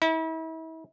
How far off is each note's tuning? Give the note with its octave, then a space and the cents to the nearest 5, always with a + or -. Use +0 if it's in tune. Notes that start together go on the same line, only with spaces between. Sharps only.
E4 -40